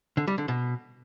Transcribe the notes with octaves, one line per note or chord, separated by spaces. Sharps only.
D3
G3
D3
B2